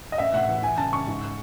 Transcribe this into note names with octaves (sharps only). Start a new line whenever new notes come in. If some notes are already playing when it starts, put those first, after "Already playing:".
D#5
A1 E5
A2 F#5
E3 F#5
E3 G#5
C#2 A5
C#2 C#6
G#2